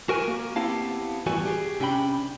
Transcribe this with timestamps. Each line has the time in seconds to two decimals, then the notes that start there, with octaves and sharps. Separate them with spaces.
0.09 F#4 A#4 G#5
0.28 A#3
0.56 B3 C4 E4 G4 F5 A5
1.26 E2 A2 E3 G3 F#4 G#5
1.45 G4 G#4
1.80 C3 C#4 D4 G5 B5